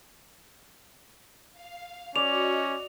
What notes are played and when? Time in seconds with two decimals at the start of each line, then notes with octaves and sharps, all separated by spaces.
1.53 F5
2.16 C#4 F#4 D5 D#5 F7